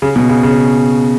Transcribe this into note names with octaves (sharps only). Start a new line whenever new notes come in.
C#3
B2
C#3
C#3